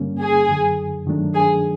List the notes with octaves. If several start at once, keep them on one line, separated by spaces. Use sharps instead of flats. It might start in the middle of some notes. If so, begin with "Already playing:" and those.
Already playing: G2 D3 G3 A#3 C#4
G#4
F#2 D3 F#3
G2 D#3 F#3 A3 D4
G#4